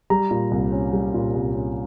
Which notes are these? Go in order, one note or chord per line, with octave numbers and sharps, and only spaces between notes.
G3 A#5
A#2
C2
C#4
G3
A#2
C2
C#4